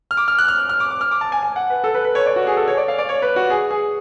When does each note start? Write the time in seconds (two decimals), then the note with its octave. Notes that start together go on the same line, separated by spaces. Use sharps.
0.11 F6
0.17 D6
0.28 F6
0.38 F#6
0.48 F6
0.69 F6
0.80 D6
0.91 D6
1.01 F6
1.11 D6
1.21 A5
1.32 G#5
1.43 G#5
1.56 F#5
1.70 B4
1.84 A4
1.95 B4
2.05 B4
2.15 C#5
2.26 D5
2.36 F#4
2.47 G#4
2.57 A4
2.68 C#5
2.77 D5
2.88 F5
2.98 D5
3.09 C#5
3.22 B4
3.36 F#4
3.50 G#4
3.71 G#4